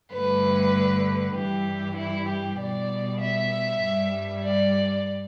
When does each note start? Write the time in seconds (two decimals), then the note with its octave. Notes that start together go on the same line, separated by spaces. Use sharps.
0.12 G2 D3 A3 B4
1.36 G2 E3 G3 G4
1.97 E4
2.29 G4
2.59 B2 G3 D5
3.21 E5
3.84 G2 G3
4.45 D5